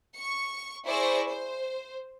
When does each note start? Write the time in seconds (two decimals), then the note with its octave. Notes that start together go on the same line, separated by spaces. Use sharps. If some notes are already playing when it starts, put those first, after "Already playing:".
0.16 C#6 C#7
0.85 E4 G#4 C5 D5 C#6 A#6
1.29 C5